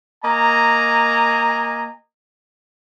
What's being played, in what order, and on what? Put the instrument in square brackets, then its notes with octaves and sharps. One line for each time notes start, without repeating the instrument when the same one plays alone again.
[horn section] A#3 D#5 G#5 A#5